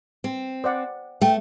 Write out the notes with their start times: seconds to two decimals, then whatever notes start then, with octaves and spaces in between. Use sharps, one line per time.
0.24 C4
0.64 C5 D5 F#5
1.22 A3 G5